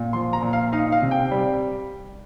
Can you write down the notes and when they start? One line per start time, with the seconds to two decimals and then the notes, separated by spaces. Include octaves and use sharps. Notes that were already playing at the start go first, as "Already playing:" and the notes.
Already playing: A#2
0.13 F3 C6
0.33 A#5
0.42 A#2
0.53 F5
0.72 D#4 F5
0.92 F5
1.02 C3
1.11 G5
1.31 G3